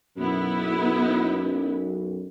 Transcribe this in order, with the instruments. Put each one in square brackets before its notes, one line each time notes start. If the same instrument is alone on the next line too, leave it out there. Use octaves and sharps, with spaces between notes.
[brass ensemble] B1 F#2 [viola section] B3 E4